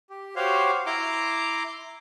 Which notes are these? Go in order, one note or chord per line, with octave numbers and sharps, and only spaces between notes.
G4
F#4 G4 C5 C#5 F5
E4 A#5 C6 D6